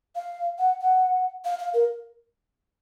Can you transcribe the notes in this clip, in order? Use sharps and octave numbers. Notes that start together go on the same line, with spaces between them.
F5
F#5
F#5
F5
F5
A#4